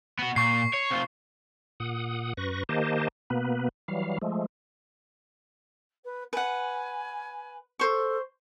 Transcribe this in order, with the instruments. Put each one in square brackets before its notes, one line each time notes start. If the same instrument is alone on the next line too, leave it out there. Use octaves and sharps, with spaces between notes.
[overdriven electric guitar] B3 F#4
[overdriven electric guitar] A#2 [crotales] C#6 C7
[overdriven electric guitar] C#5
C3 F4
[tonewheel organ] A#2 F#5 D#6
F#2 B4 C#6 A#6
D#3 A#3 G4 C5 D#5 A5
B2 A#3 B3 B4
E3 F#3 G3 F5
F3 G#3 A3
[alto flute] B4
[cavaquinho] B4 F#5 [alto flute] G#5
[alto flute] A4 [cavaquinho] C5 C#6